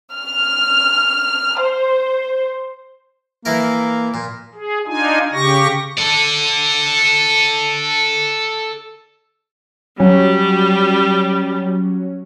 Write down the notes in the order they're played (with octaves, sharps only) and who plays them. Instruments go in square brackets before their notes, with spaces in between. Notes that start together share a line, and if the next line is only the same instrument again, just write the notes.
[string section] F6
C5
[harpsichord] E3 E4 A#4 [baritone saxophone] A#3
[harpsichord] A#2
[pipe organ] G#4
D4 D#4 F4 G#5
C#3 G4 C#6 A#6
[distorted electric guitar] A4 D5
[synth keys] F#3 C#4 [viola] G3